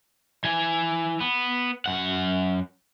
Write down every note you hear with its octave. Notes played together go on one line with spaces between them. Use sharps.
E3 G#5
B3
F#2 F#5